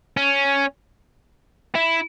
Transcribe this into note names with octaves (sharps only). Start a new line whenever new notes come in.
C#4
E4